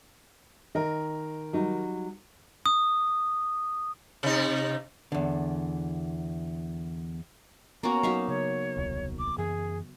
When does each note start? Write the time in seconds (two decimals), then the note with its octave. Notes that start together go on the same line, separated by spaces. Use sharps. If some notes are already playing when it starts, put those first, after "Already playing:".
0.75 D#3 A#4 D#5
1.53 F#3 G3 D#4
2.66 D#6
4.23 C3 D#4
5.12 E2 D3
7.83 A#3 B3 C#4 F#4 A#5
8.03 F#3 D#4 F#4 E5 F5
8.28 C#3 F#3 C#5
8.77 D#1 C2
9.19 D6
9.38 F#2 E3 G#4